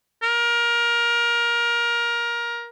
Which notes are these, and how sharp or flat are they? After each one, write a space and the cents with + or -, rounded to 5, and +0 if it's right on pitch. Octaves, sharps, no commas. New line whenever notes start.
A#4 +20